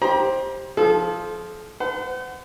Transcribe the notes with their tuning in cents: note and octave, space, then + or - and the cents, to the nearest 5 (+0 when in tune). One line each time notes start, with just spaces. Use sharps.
G4 +0 C5 +15 A#5 +40
F3 +0 A4 -40
C5 -45 F#5 +0